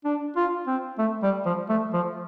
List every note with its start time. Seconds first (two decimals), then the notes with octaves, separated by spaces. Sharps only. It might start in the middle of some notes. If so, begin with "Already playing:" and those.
0.05 D4
0.36 F4
0.67 C4
0.98 A3
1.23 G3
1.46 F3
1.69 A3
1.93 F3